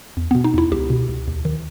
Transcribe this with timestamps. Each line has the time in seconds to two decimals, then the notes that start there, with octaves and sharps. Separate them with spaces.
0.17 E2
0.31 B2 B3
0.44 D#4
0.54 E2 E4
0.72 C#2 G4
0.90 B2
1.09 C#2
1.28 D#2
1.45 D#3